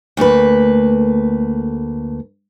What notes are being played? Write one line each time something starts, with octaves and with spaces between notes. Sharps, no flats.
D2 A3 A#3 B4